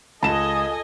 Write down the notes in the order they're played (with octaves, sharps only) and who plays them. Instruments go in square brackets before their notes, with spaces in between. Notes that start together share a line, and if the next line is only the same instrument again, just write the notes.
[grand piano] C#2 [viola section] A4 D#5 G#5 [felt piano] A5 E7